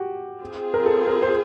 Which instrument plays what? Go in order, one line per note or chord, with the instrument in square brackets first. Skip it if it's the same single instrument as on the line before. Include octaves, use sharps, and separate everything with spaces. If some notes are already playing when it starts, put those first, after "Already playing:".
Already playing: [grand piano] F#4 G4
[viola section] C4 F4 G#4
[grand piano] A#4
A4
A#4
C5